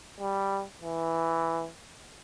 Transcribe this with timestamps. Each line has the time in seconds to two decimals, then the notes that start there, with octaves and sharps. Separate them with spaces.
0.21 G3
0.82 E3